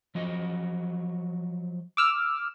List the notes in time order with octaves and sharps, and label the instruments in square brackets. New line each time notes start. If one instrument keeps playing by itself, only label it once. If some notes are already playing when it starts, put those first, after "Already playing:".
[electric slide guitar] F3 F#3 D#5
[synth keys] D6 E6 F6